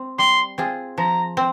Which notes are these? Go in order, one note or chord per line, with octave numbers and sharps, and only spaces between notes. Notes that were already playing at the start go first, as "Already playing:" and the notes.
Already playing: C4
G3 C6
C4 F4 G#4
F3 A#5
C4